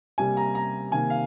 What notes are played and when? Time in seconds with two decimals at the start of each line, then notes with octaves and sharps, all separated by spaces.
0.18 C3 G3 A#3 G#5
0.37 A#5
0.55 A#5
0.92 C3 D#3 A#3 G#5
1.10 F5